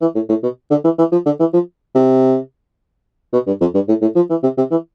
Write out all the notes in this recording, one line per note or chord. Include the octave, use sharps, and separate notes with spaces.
E3
A2
A2
B2
D3
E3
E3
F3
D3
E3
F3
C3
B2
G2
F2
G2
A2
A2
F3
E3
C3
C3
E3